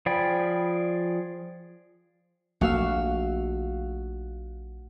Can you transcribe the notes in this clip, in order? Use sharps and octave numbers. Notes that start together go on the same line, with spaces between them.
F3 G#4 D5 G5 B5
A#1 A3 A#3 F#4 F5 E6